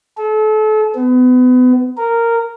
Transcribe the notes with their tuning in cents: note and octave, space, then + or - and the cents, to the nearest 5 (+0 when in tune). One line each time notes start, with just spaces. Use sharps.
A4 -35
B3 +30
A#4 -10